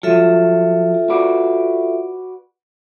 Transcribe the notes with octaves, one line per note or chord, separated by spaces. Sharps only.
F3 F#3 F4 A4 E5
F#4 B4 D5